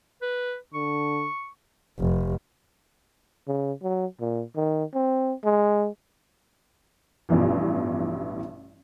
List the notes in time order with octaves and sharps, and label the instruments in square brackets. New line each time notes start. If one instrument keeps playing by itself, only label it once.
[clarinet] B4
[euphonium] D3 [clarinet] C#6
[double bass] F1
[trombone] C#3
F#3
A#2
D#3
C4
G#3
[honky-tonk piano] A1 G2 B2 E3 F3